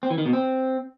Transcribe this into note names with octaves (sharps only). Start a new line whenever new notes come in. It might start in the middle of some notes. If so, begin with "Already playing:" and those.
C4
E3
D#3
B2
C4